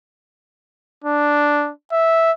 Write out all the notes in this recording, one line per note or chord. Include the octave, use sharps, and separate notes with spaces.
D4
E5